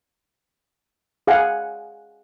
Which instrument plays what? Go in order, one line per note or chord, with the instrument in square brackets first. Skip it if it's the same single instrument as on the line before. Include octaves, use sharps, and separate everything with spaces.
[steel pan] G#4 F5 F#5 G#5